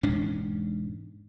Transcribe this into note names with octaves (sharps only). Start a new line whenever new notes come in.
E1 G#2 C#4 D4